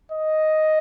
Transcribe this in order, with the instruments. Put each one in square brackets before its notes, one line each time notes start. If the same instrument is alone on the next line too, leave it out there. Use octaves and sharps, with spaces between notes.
[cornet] D#5